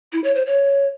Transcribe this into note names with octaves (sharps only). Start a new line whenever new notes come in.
E4
C#5
C5
C#5